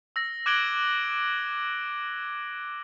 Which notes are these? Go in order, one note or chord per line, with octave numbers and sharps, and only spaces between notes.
E6 A#6
D6 F#6 G#6 D7 F#7 G7